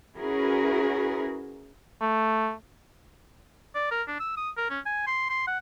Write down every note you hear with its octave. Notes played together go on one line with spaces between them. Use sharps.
C#4 E4 F#4 G#4 A#4 B4
A3
D5
A#4
D4
E6
D#6
A#4
C#4
G#5
C6
C6
F#5